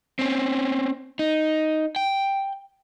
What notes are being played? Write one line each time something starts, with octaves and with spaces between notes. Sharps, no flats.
C4 C#4
D#4
G5